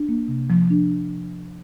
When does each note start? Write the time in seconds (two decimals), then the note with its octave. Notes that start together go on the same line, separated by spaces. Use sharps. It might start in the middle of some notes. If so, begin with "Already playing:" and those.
Already playing: D4
0.09 A#3
0.28 C3
0.50 F3
0.70 D4